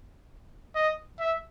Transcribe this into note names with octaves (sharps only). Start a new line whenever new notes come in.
D#5
E5